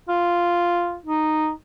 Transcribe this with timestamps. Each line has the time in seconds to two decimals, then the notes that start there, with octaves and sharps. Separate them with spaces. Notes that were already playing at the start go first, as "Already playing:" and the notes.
0.08 F4
1.06 D#4